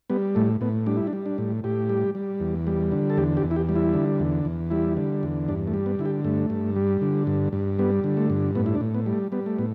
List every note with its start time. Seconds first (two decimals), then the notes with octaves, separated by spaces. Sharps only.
0.10 G3 B3
0.35 A2 A3
0.61 A2 B3
0.86 G3 D4
0.97 E4
1.07 D4
1.13 G3
1.26 D4
1.38 A2
1.64 A2 G4
1.89 G3
2.15 G3
2.40 E2
2.67 G3
2.92 D3
3.10 A4
3.17 E2 G4
3.37 G4
3.43 E2
3.51 E4
3.56 G4
3.69 G3
3.76 E4
3.94 D3
4.20 E2
4.45 E2
4.71 G3 E4
4.97 D3
5.23 E2
5.48 G2 D4
5.67 A3
5.74 G3
5.86 B3
5.99 D3 E4
6.05 G4
6.24 G2 A3
6.50 G2
6.76 G3
7.01 D3
7.27 G2
7.53 G2
7.79 G3 B3
8.04 D3
8.17 A3
8.30 G2
8.55 A2 B3
8.66 E4
8.75 D4
8.81 A2
8.95 B3
9.06 G3
9.13 A3
9.32 G3 B3
9.46 A3
9.58 A2 B3